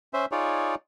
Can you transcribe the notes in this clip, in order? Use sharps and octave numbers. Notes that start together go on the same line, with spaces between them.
C#4 C5 E5
D#4 F4 G#4 C#5 D5